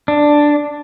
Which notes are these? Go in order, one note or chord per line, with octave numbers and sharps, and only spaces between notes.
D4